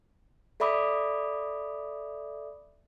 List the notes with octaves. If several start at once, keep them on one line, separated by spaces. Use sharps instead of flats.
A4 D5 E5 B5 D6 D#6